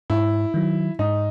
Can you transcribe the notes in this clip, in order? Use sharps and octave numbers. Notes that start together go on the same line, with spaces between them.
G#2 E4
D#3 F#3
G#2 D#4